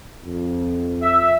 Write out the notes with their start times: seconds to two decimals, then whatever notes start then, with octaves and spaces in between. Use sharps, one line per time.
0.24 F2
1.02 E5